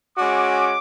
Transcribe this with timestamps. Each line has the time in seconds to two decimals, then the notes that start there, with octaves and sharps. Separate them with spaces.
0.17 G#3 C#4 F#4 D6